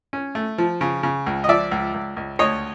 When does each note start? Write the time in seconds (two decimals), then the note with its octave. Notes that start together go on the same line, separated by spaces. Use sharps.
0.13 C#4
0.35 A3
0.58 F3
0.81 C#3
1.03 C#3
1.26 C#2
1.44 D#5
1.48 F3 D5 E5
1.71 C#2
1.94 C#2
2.16 C#2
2.39 D2 C#5 D#5